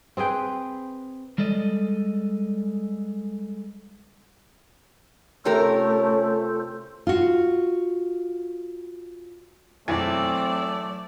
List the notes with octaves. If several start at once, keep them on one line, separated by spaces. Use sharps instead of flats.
C4 G#4 B4 G5
G3 G#3 A4 D5 D#5
C3 A3 C#4 F4 G4 A4 A#4 C5
F4 F#4
B1 E2 E3 F#3 A3 C4 D5